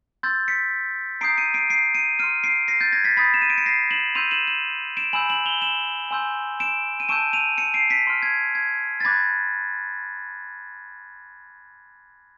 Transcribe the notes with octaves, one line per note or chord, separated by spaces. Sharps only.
C6 E6 G6 A6
B6 C#7
A#5 D#6 G6 C7 D7
C#7 D#7
C7 D7
C7 D7
C#7 D#7
C6 F6 C#7 D#7
C7 D7
A#6 C7
G6 A6
G#6 A#6
A6 B6
B5 D#6 G6 A6 B6
E7
D#7
D7
C#7
A#6 C7
E7 F#7
C6 E6 G6 D#7 F7
E7 F#7
E7 F#7
D7 E7
G#5 B5 E6 G6 E7 F#7
E7 F#7
F7 G7
E7 F#7
G#5 C6 E6 G6
D7 E7
D#7
A5 C#6 E6 G6 D7 E7
D#7 F7
C#7 D#7
C7 D7
B6 C#7
C6 F6
G#6
G#6
A6
B5 D6 F#6 G#6 A#6